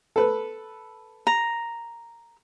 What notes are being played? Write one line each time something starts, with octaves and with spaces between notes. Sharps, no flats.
A4 B4
A#5